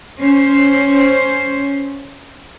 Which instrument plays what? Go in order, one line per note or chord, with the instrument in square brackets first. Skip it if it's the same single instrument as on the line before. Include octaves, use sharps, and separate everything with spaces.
[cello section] C#4 C5